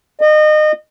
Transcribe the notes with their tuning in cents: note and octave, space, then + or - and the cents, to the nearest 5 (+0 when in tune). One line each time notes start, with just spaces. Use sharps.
D#5 -30